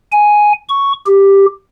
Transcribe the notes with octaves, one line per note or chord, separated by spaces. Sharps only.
G#5
C#6
G4